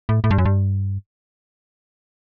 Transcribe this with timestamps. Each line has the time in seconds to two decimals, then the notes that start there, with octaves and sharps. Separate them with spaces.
0.09 A2
0.24 A2
0.31 G2
0.38 F#2
0.45 G2